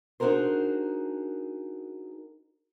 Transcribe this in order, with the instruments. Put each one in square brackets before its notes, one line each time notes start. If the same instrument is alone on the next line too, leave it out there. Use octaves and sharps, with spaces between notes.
[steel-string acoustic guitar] D4 D#4 F#4 G#4 A#4 C5